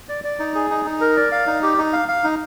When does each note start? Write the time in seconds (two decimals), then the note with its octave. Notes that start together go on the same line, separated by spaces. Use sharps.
0.09 D5
0.24 D5
0.40 D#4
0.55 G#4
0.71 D#4
0.85 D#4
1.01 A#4
1.17 D5
1.32 F5
1.47 D#4
1.63 G4
1.78 D#4
1.93 F5
2.08 F5
2.24 D#4